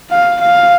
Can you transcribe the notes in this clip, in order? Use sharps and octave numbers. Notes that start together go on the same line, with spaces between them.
F5
F5